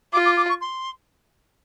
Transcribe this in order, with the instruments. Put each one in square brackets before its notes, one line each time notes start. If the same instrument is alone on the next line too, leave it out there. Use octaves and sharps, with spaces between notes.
[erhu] F4 [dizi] D6
[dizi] D6
D6
C#6
C6